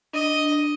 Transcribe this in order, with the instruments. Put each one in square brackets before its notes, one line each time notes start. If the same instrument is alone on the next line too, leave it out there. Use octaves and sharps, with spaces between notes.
[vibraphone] D4 [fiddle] D#5